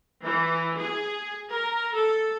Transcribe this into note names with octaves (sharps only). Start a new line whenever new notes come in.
E3
G#4
A#4
A4